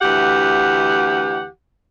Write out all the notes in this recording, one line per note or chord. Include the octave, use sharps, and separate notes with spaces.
D2 E3 G4 F#5